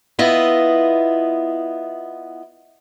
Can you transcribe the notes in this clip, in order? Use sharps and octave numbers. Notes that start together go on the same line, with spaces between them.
B3 E4 F4 D#5